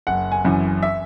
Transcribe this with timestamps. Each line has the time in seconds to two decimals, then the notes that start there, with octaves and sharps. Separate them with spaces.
0.07 F#1 F#5
0.32 G#5
0.45 F#2 E3
0.83 E5